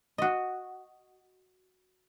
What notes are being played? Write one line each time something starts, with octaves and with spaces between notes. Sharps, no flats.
F#4 D#5